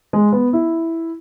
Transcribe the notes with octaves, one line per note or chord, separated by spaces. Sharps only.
G#3
B3
E4